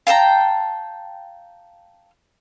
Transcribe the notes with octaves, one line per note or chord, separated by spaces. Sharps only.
F5 G5 A5 A#5